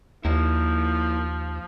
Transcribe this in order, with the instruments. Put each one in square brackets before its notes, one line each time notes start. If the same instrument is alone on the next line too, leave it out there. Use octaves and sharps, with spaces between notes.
[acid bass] D#2 [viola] F3 [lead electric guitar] A#3 E4